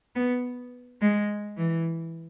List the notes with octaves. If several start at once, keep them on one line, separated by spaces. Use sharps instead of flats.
B3
G#3
E3